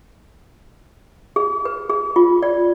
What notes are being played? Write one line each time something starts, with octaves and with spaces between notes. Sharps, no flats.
G#4
B4
G#4
F4
D5